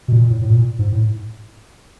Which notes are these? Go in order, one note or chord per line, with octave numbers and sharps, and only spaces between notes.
B2
A#2
A2
A2
A#2
G#2
A2